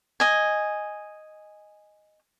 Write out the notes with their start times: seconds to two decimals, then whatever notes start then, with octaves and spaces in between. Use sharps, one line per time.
0.20 D#5 G#5